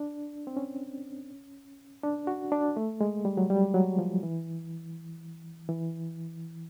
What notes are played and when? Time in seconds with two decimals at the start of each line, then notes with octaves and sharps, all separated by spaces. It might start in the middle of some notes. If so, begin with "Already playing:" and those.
Already playing: D4
0.47 C4
0.57 C#4
2.03 D4
2.27 F#4
2.52 D4
2.77 A3
3.01 G#3
3.25 G3
3.37 F#3
3.50 G3
3.74 F#3
3.99 F3
4.23 E3
5.69 E3